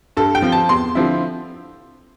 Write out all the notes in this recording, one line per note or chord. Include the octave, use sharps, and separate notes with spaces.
G2 A4
G5
F3 C4
A5
E2 C6
D3 F3 C4 E4